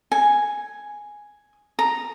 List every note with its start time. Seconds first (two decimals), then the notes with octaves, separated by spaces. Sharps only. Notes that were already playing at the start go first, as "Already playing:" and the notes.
0.12 G#5
1.79 A#5